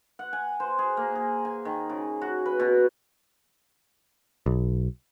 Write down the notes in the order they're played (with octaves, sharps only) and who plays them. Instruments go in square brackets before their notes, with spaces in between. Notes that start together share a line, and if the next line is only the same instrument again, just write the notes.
[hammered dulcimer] F#5
G#5
C5
G#4
A#3
G#4
G#5
D#3
C#3
F#4
B4
B2
[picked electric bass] B1